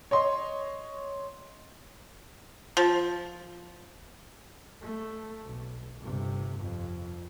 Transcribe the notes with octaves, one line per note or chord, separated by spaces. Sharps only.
C#5 D#5 C6
F3
A3
B1
G1 C3
F2